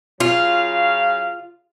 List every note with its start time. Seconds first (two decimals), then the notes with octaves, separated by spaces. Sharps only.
0.20 C#3 F#3 F4 F5